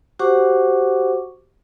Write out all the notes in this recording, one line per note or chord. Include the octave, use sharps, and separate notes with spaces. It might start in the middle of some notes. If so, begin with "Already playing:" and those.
F#4 G4 C5 F#5 C#6 D6